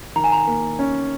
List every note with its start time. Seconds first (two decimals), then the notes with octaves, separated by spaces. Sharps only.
0.16 D#3 A#5
0.24 G#5
0.32 A#5
0.47 A#3
0.79 C#4